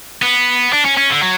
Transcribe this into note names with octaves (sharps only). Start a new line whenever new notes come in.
B3
D4
C#4
C#4
D3
F#3